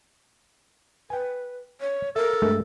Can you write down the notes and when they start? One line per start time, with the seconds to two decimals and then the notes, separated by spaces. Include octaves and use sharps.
1.10 B4 G5 G#5
1.81 C#5
2.16 A4 A#4 E5
2.42 G2 G#3 A3